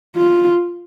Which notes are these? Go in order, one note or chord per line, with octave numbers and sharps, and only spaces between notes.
F4